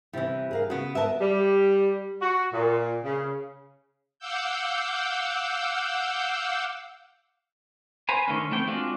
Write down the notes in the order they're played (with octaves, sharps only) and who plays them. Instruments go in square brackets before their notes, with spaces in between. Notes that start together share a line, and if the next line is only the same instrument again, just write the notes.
[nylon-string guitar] C3 E4 [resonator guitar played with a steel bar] E3 G3
[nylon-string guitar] G#4 A#4 F5
[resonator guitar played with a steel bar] C#3 B3 [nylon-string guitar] F#4
[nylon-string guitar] B3 B4 A5 [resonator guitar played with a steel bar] A#4 E5
[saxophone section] G3
F#4
A#2
C#3
[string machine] F5 F#5 D6 E6 G6
[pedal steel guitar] B4 C5 G#5 A#5
D3 D#3 A3 C#4
E3 A3 C4 G5
G#3 C4 D4 F4 F#4